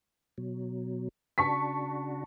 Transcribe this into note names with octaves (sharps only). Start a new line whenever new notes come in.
B2 F#3
C#3 D4 F#4 A5 C#6 B6